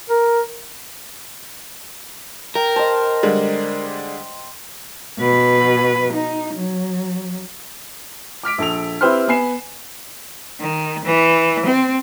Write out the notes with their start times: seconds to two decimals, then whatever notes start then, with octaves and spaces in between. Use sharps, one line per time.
0.10 A#4
2.55 A#4 G5
2.76 C5 D#5 A5
3.23 D3 G3 G#3
5.19 B2 B4
6.13 D#4
6.54 F#3
8.43 D6 F6 B6 D7
8.58 A#1 A4 F7
9.01 C4 E4 G4 B4 C5 F6
9.28 B3 B4 G#5 C7 E7
10.60 D#3
11.04 E3
11.65 C4